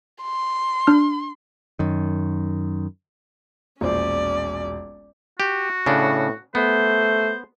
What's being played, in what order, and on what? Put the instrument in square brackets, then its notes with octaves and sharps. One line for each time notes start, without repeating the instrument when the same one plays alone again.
[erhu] C6
[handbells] D4 F6
[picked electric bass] F#2 D#3
[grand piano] E1 A#1 C5 [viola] C#4 D5
[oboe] F#4 [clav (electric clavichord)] G4
[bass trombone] A2 [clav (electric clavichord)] C#3 D4
[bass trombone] A3 [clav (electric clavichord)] B3 [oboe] C5